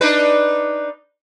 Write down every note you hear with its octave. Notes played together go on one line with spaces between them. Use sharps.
D4 D#4 B4